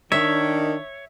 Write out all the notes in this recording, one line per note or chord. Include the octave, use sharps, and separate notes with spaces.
D#3 D4 C#5 E5